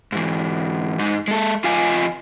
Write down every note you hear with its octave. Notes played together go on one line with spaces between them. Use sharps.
G#2 E3
G#2 D#4
G#3 A4
F2 F4 D#5 F5 G#5